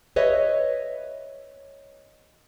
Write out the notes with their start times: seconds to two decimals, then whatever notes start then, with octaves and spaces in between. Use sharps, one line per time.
0.16 B4 C#5 D#5 E5